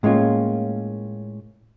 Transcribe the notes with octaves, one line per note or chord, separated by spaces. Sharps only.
A2 G#3 A#3 C#4 F4